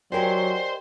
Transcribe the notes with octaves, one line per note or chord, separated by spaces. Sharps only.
F#3 G4 A#4 C5 D5 D#5 G#5